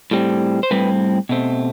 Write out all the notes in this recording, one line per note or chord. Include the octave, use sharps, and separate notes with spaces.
A2 G3 C4
C5
A2 G3 C4 B4
B2 A3 C4